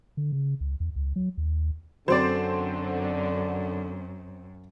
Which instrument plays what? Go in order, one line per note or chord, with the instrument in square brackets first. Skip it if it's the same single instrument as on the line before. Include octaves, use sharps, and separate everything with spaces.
[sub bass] D3
C#3
C#2
E2
C#2
F#3
D#2
[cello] F#2 [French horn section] D3 [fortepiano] F#3 D5 [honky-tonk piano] C4 C5